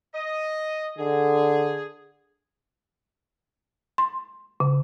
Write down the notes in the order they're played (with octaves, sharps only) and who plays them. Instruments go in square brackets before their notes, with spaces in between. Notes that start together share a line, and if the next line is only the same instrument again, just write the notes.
[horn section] D#5
[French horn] D3 [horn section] G#4
[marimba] C6
C#3